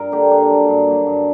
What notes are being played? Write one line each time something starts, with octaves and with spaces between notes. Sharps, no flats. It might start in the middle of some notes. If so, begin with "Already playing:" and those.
Already playing: G2 A#4
D3 A#3 G4
G2 D4
F#3 A#3
G2
F#3 A#3
G2